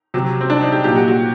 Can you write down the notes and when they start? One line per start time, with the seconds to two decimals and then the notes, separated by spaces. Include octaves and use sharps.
0.14 C3 F#3
0.41 C4
0.50 D4
0.61 D#4
0.72 G4
0.84 A#2 F#3 G4
0.96 F#4
1.08 F#4